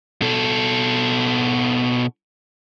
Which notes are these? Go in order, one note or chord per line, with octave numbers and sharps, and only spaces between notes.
B2 A4